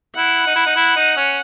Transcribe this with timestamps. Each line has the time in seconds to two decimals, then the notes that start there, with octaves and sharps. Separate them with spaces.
0.16 E4 F#5
0.46 D#4
0.55 E4
0.66 D#4
0.76 E4
0.96 D#4
1.17 C#4